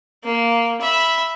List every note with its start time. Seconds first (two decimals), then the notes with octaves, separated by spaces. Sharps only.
0.24 A#3
0.81 E5 B5